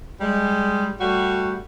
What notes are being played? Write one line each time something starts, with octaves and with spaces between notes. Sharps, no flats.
G3 G#3
G3 A3 F#4